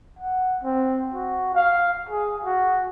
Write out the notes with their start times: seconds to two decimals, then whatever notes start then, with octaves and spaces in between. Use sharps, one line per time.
0.19 F#5
0.64 C4
1.14 F#4
1.55 F5
2.09 G#4
2.44 F#4